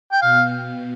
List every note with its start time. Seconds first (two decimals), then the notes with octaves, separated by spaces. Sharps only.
0.12 G5
0.22 B2 F5